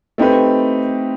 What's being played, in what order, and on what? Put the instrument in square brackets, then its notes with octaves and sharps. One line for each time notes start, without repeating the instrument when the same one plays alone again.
[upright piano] A3 C4 D#4 G4 B4